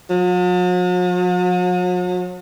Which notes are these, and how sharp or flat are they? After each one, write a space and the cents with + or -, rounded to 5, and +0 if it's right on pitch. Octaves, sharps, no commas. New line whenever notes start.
F#3 -45